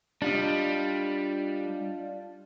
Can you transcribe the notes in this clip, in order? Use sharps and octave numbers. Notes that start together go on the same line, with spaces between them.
G3 D4 F4 D#5